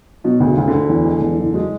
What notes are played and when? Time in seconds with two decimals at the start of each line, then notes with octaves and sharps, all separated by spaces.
0.24 B2 F#3
0.40 D2
0.46 C#3
0.57 D2
0.68 D3
0.73 D2
0.89 E2
1.05 G#3
1.21 E2
1.37 F#1
1.54 F#3 G#3